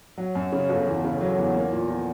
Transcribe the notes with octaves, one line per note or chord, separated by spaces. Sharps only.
F#3
F#2
C#3
G1
E2
C#3
F#3
E2
A#3
A#2
F3